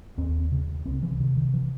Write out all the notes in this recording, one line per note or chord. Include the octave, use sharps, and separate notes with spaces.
D#2 C4
C#3
C2 C4
E3
C3 D#3
D#3
E3